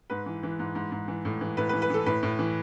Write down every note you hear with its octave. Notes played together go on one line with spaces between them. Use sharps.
G#2 B4
E3
E3
G#2
G#2
G#2
E3
A2
E3
A2 B4
B4
E3
B4
E3 A4
A2 B4
A2
E3